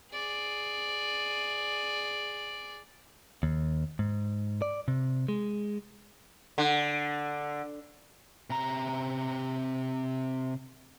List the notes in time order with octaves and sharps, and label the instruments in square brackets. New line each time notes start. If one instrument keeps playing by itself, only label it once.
[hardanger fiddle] G#4 D5
[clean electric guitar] D#2
G#2
D5
C3
G#3
[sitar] D3
[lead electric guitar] C3 A#5